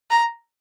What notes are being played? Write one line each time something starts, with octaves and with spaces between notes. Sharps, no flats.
A#5